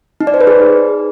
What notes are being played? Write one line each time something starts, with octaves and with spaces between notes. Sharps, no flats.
D#4
D5
C5
B4
G#4